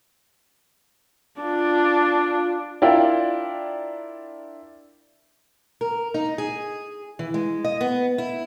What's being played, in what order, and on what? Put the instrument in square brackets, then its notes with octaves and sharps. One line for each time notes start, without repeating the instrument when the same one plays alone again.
[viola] D4 F4
[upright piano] D4 E4 F4 A#4 D5 G5
[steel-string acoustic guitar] A#4
D#4
G#4
E3
G#3
D#5
B3
E4